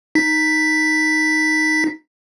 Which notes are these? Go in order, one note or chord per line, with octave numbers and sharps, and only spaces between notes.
D#4 B6